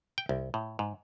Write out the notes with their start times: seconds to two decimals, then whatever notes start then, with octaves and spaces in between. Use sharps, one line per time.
0.18 G5
0.29 C2
0.54 A2
0.79 G#2